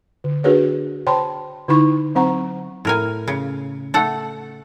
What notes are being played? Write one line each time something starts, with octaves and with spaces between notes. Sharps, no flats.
D3
D4 F#4 G#4 A#4 B4 C#5
C5 C#5 G5 A5 B5 C6
D3 D#4 E4 B5 C#6
F#3 C4 C5 F#5 A#5 C#6
A2 A#4 G#5
C#3
A3 A4 F#5